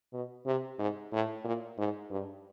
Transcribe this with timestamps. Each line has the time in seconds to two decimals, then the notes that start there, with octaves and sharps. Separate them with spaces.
0.13 B2
0.46 C3
0.79 G#2
1.12 A2
1.45 A#2
1.78 G#2
2.11 G2